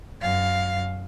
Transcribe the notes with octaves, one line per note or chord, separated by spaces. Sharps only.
F#2 F5